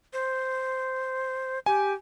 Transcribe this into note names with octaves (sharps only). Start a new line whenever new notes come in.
C5
G4 G#5